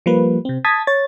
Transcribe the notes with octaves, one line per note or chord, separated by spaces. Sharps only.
F3 G3 A#3 B4
C3 C4
A5 D#6 G#6 A6 B6
C#5 A6